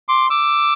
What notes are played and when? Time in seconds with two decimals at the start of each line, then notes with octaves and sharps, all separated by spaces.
0.08 C6 D6
0.30 D6 E6